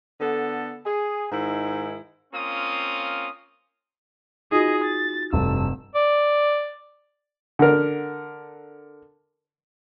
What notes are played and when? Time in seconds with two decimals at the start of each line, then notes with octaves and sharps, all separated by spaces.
0.21 D3 B3 A4
0.85 G#4
1.32 G#2 D#3 E4
2.34 A#3 C4 C#4 F4 D#6
4.52 D#4 F4 F#4 G#4 D#5
4.84 A6
5.33 F1 G2 A4 E6
5.95 D5
7.59 D3 A#4